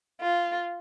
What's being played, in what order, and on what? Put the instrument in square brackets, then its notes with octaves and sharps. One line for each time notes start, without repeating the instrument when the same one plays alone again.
[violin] F4